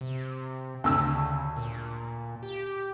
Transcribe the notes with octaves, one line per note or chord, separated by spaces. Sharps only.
C3
D2 C#3 E6
A#2
G4